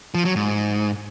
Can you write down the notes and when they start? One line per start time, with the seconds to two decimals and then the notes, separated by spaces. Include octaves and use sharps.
0.15 F3
0.25 F#3
0.35 G#2